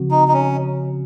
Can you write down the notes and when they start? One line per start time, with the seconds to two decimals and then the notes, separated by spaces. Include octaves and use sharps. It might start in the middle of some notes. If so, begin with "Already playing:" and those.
Already playing: C#3 F3 C4 F#4
0.11 D#4
0.28 D#4
0.33 C#4